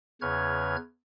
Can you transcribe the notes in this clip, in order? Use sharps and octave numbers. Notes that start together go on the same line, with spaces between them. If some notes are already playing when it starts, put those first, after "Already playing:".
E2 C#3 B4 C#5 F6 G#6